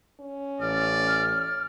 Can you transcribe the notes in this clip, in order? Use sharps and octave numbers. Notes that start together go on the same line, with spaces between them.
C#4
A1 D5 F6